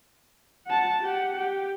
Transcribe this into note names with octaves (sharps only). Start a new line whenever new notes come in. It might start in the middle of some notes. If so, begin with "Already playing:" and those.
F#5 A5
G4 F#5
G4